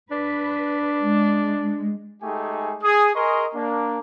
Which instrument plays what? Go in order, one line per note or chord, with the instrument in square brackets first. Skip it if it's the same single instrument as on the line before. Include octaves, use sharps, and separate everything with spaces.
[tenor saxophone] D4 [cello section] B4
[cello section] G#3
[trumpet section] G#3 A3 D#4 G4 G#4 G#5
G#4 D#6
G#4 A#4 D#5 G#5 C6 C#6
A#3 D4